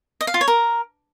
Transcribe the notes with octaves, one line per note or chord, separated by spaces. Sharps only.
D#5
F5
F4
C#5
A#4